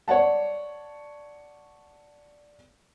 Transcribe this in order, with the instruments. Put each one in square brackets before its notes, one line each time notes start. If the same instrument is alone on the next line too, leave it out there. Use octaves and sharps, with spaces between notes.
[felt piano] C#5 D5 F#5 A5